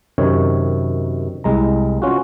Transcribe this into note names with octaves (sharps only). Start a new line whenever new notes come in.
F#2 C3 D#3 C#5
C2 G#3 A#5
C#4 F4 F#4